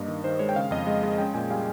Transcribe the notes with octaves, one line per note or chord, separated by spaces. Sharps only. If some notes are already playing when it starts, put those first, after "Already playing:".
Already playing: G2 A#3 D#5
D#3
D#3 C5
G#3 C#5
G5
C#3 F5
F2 D#5
G#3
G#3
C#4 G5
A#2 G#5
G3 F5